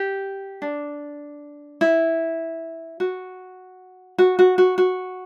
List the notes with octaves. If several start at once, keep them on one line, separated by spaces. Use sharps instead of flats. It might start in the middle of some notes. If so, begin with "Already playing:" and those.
Already playing: G4
D4
E4
F#4
F#4
F#4
F#4
F#4